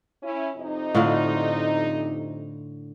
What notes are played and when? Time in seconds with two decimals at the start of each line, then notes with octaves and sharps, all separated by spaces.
0.23 C#4 E4
0.56 F2 C3 D#4
0.95 A2 D3 F4